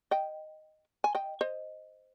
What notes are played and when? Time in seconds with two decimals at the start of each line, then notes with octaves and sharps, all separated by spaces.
0.11 D#5 G5
1.04 G#5
1.15 D#5 G5
1.41 C5 D#5